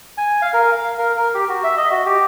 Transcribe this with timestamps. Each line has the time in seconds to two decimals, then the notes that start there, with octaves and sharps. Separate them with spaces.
0.18 G#5
0.42 F5
0.53 A#4
0.72 F5
0.98 A#4
1.17 A#4
1.34 G4
1.49 F#4
1.63 E5
1.77 D#5
1.91 F#4
2.06 G4